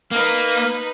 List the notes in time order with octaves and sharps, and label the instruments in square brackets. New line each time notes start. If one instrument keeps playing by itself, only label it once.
[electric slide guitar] A#3 [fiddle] D#4 B4 [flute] F6